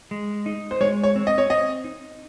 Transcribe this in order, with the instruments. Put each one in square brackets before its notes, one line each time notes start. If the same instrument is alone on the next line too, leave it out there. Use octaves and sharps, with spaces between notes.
[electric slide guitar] G#3
D#4
[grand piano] C5
[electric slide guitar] G#3 [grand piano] C#5
[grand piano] C#5
[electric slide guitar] C4
[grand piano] D#5
C#5
[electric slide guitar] C4 [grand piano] D#5
[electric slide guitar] D#4